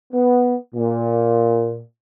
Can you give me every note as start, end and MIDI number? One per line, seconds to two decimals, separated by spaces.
0.13 0.54 59
0.75 1.81 46